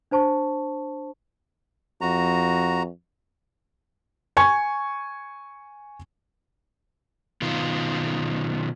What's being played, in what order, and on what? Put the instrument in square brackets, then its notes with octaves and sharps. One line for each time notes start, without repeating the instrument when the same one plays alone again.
[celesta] D4 C5 A5 C#6
[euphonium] F2 [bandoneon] F#4 A#5
[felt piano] G#5 C#6 G#6
[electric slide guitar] B2 D#3 F4